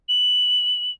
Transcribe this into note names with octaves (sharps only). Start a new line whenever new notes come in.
F#7